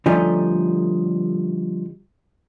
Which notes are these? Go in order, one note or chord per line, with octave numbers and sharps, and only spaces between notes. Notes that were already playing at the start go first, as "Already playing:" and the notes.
D3 F3 G3 A3 C#4 D#4